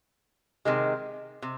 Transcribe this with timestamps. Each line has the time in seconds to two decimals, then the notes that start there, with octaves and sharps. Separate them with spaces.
0.65 C3 D#3 G#3
1.42 C3